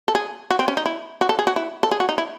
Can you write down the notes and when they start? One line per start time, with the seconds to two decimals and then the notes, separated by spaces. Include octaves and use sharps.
0.08 A4
0.15 G#4
0.51 F#4
0.59 C4
0.68 C#4
0.77 D#4
0.86 E4
1.21 F#4
1.29 A4
1.39 G#4
1.47 F#4
1.56 E4
1.83 A4
1.91 G#4
2.00 F#4
2.09 D#4
2.18 E4